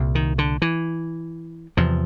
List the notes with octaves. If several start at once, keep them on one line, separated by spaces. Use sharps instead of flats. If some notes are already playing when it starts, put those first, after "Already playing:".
Already playing: C2 A#2
D#3
D3
E3
E2 C3 F3